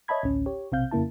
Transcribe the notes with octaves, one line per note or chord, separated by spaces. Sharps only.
C#5 D#5 E5 A5 B5 G#6
A1 D2 C#4
G4 C#5
B1 C3 C4 F5 G6
F2 C#3 A#3 E4 A5